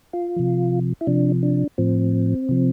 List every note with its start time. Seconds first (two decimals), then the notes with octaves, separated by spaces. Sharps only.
0.13 F4
0.36 C3 F3
1.01 E4
1.07 C3 F3 D4
1.43 D4
1.78 A2 F3 C4
2.49 C3 F3